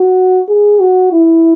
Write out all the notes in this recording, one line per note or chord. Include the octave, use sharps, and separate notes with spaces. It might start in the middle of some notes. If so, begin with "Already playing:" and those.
Already playing: F#4
G#4
F#4
E4